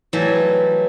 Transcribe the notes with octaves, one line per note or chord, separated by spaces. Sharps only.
E3 F#3 G3 A3